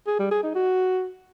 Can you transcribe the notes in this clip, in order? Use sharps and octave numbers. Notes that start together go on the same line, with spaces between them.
G#4
G3
G#4
D#4
F#4